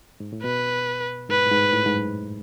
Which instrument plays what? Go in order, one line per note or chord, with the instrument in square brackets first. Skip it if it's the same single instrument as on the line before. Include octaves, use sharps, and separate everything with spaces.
[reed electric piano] G#2
A2
[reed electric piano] B2 [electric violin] B4
[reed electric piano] G#2 [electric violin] B4
[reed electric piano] A2
G#2
A2
G#2
F#2